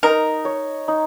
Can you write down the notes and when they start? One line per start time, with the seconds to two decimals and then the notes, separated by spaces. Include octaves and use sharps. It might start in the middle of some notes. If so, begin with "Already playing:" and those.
0.03 D#4 A#4
0.45 C#5
0.88 D#4